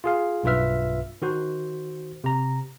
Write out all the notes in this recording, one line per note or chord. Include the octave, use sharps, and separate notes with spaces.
F4 G#4 F5
B1 G2 F4 B4 E5 F6
D#3 F#4 C5
C3 A#5